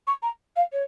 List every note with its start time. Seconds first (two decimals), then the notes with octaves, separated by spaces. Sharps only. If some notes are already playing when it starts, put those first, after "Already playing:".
0.07 C#6
0.22 A#5
0.56 F5
0.72 C#5